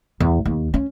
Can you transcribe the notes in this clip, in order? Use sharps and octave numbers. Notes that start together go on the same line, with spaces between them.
E2
D#2
C#4